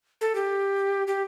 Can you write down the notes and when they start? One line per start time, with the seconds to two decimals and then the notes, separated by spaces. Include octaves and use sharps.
0.21 A4
0.35 G4
1.07 G4